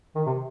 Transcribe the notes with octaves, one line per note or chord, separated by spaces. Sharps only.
D#3
C3